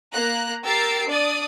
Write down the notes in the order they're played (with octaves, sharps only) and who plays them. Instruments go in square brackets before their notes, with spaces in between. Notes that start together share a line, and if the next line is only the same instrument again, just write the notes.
[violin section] A#3 A#5 F#6
G4 A#4 E6 A6 C7 D7
D4 D5 D#6 A6